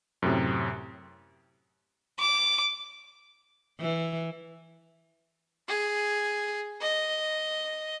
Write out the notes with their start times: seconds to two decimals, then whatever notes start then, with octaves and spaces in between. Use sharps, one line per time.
0.22 F#2 A2 C3
2.19 D6
3.80 E3
5.68 G#4
6.81 D#5